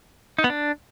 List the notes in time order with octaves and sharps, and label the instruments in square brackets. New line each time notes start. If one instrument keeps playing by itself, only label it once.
[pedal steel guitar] D#4
B3
D4